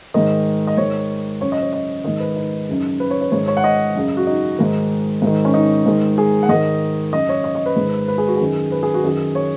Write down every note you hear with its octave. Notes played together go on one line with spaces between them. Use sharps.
G#2 D#3 D#5
D#5
G#2 D#3 C#5
F#2 C#3 C#5
D#5
C#5
D#5
G#2 D#3 D#5
B4
D#4
F#2 C#3
B4
C#5
C#5
G#2 D#3 C#5
C#5
F#5
D#5
F#2 C#3
F#4
D#4
G#2 D#3
G#2 D#3
C#4
D#4
G#2 D#3
G#4
F#5
G#2 D#3 D#5
F#2 C#3 D#5
C#5
D#5
D#5
B4
G#2 D#3
B4
G#4
F#4
F#2 D#3 G#4
B4
G#4
F#4
F#2 D#3 G#4
C#5